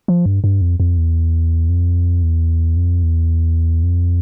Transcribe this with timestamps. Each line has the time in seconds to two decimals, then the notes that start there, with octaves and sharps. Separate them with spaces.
0.08 F3
0.26 G2
0.44 G2
0.61 F2
0.80 F2
0.97 E2
1.69 F2
2.23 E2
2.77 F2
3.03 E2
3.83 F2